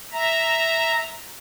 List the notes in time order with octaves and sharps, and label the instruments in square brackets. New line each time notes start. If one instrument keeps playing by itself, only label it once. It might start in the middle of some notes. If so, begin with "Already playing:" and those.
[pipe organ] E5 A#5